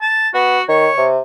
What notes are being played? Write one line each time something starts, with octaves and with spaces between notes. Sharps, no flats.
A5
B3 F#4
D#3 C#5
C3